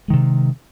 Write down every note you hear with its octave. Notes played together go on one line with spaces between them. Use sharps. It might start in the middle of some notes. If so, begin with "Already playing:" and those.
C3 D#3 G#3